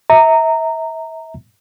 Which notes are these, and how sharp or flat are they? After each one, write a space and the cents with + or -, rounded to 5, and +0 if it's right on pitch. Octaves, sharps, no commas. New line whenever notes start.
E5 -30 A#5 -15